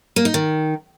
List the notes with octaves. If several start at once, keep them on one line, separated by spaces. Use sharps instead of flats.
A#3
D#4
D#3